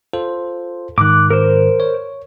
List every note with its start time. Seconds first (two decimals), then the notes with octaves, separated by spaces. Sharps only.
0.13 F4 A4 C5
0.98 G#2 D#3 D6 F#6
1.31 A#4 C5
1.80 C#5